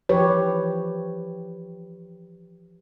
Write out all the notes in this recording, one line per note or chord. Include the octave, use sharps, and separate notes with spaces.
E3 F3 G4 B4 C#5